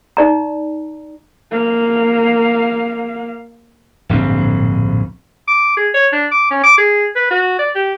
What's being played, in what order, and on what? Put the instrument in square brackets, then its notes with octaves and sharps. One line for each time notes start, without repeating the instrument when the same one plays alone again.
[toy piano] D#4 D5 A#5
[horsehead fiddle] A#3 F5
[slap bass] D1 A#1 G2 C4
[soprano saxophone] D6
G#4
C#5
D4
D6
C#4
D6
G#4
B4
F#4
D5
G4